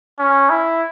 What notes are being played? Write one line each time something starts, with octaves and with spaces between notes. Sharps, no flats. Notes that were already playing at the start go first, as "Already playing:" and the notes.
C#4
E4